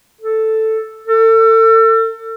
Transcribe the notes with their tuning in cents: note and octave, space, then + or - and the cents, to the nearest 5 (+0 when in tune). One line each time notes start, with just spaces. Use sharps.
A4 +0
A4 +35